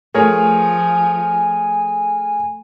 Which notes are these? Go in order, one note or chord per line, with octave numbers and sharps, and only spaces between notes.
F3 A3 F4 G#4 A#4 C#5 G#5